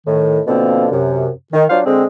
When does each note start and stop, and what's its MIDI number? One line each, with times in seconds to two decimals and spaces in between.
0.06 0.39 45
0.06 0.39 51
0.47 0.88 47
0.47 0.88 50
0.47 0.88 53
0.47 0.88 58
0.47 0.88 60
0.92 1.29 42
0.92 1.29 48
1.53 1.64 51
1.70 1.80 54
1.70 1.80 62
1.70 1.80 65
1.70 1.80 72
1.70 1.80 77
1.86 2.05 50
1.86 2.05 56
1.86 2.05 60